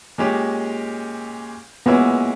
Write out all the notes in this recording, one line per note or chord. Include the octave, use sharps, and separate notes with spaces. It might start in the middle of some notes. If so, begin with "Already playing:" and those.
A#2 G#3 C#4 G4
A#2 G#3 B3 C#4 E4